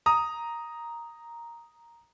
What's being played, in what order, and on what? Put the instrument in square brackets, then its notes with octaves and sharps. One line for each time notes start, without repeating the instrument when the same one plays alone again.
[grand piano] A#5 D#6